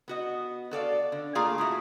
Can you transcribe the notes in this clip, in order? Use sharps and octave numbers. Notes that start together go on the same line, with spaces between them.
B3 F#4 D#5
F#4 A4 D5 F5
D3
A3 A#3 F4 G#4 F5 G#5
A2 E4 F#4 E5